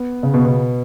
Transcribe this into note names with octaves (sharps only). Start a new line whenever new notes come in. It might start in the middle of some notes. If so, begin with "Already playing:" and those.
Already playing: B3
C#3
B2
B2